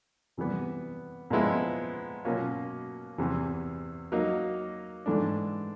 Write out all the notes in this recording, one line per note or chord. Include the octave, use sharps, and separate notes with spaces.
C3 E3 G3 B3
A#2 F3 G#3 B3 E4
B2 F#3 A#3 C#4 F4
E2 C3 E3
F#3 A#3 D#4
G#2 E3 A3 D4